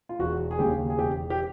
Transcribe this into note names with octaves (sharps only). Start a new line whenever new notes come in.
F4
E1 F#4
G#4
D#2 C#3 G4
G#4
E1 G4
G4